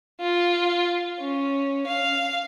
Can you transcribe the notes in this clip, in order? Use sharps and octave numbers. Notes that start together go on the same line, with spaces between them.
F4
C#4
F5